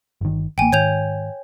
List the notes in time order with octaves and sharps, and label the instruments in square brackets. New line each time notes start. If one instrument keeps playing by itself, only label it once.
[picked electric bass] G1 D#3
[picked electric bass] A1 A#3 [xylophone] G5 G#5
[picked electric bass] G#2 D#3 [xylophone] C#5 G6 F7